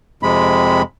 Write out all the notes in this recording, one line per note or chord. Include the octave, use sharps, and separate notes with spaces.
F2 C3 G#3 B5